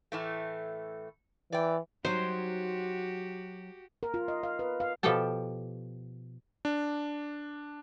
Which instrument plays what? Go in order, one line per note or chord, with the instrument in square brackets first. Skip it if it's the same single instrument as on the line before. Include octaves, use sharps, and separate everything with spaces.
[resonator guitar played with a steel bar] A2 E3 A3
[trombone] E3 [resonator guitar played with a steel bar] D5 G5
[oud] F#3 D#4 [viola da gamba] F#4 G4 [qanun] C5
[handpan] A#4
F4
D#5
F5
B4
F5
[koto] B2 F3 G4 A4 G5 A5
[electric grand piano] D4